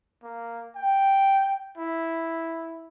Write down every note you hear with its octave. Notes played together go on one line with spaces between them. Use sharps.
A#3
G5
E4